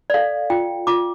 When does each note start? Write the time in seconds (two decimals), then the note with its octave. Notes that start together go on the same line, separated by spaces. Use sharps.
0.10 D5
0.14 A4 F5
0.50 F4 G5
0.87 F4 D6